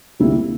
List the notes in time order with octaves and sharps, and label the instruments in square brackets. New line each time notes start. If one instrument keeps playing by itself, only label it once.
[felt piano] D2 C3 G3 A#3 E4